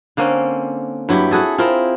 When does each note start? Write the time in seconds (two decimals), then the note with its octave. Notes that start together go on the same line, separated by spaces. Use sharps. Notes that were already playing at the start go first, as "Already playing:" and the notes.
0.17 D3 A#3 C4 C#4
1.09 G2 F#3 E4 G4
1.31 E4 F#4 G#4 A4
1.58 C4 E4 F4 A#4